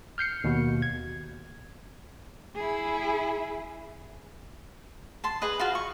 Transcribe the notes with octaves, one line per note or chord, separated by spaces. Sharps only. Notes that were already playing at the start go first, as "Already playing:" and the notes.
F6 G6 C7 C#7
D#2 B2
G#6
E4 G#4
A5 C6
G#4 B4 D#5
F4 F#4 F5
C#6